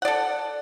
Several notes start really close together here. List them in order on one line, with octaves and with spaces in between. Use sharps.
F#5 D5 A4